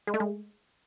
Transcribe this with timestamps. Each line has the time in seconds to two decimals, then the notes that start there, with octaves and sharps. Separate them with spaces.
0.07 G#3
0.14 A3
0.20 G#3